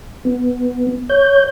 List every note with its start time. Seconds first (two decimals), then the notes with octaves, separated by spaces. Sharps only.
0.25 B3
1.09 C#5 G6